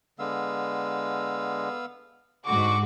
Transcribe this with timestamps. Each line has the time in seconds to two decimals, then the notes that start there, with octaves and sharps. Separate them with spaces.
0.19 D3 G#3 B3 F5 E6
2.46 G#2 D3 F#4 C#6 D6